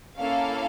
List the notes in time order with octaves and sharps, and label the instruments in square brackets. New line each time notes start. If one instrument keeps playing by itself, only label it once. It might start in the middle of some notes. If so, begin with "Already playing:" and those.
[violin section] A#3 C#4 E4 A4 F5